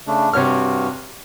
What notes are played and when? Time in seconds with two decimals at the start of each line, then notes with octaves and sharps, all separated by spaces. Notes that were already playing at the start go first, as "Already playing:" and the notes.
0.07 C#3 A3 D4
0.33 G2 C3 F#4 C#5 F6